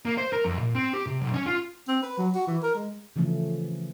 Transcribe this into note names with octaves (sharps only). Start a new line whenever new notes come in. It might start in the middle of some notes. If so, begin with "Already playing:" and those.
A#3
C5
A#4
F2
A#2
C4
G4
C3
B1
C#4
F4
C4
B4
F#3
F#4
E3
A#4
G#3
C#3 E3 F3 A3 C#4